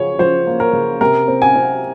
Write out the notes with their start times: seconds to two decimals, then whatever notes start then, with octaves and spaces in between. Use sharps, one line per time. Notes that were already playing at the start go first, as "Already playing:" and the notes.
Already playing: C#3 F3 C#5
0.19 F3 C5
0.47 A#3
0.60 A#4
0.73 C#3
1.01 C3 A#4
1.28 C4
1.42 G#5
1.56 C4